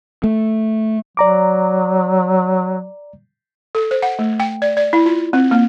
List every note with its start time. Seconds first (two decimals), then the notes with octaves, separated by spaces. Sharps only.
0.24 A3
1.17 F#3 D5 A#5 D6
3.75 A4
3.91 C5
4.03 F#5
4.19 A3
4.40 G5
4.62 D5
4.77 D5
4.93 E4
5.06 F4
5.33 C4
5.51 A#3